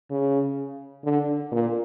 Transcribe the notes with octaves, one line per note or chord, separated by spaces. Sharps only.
C#3
D3
A#2